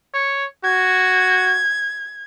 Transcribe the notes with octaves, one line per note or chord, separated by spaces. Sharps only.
C#5
F#4 G#6